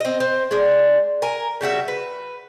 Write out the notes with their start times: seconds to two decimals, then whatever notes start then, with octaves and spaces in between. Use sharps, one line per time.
0.01 C4 D#5
0.20 C4
0.51 G#3 D4
1.22 A#4 G#5
1.61 C#3 G3 F#4 E5
1.88 B4